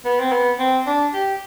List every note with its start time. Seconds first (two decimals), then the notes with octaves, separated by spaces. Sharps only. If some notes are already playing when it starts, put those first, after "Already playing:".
0.05 B3
0.20 C4
0.32 B3
0.59 C4
0.86 D4
1.13 G4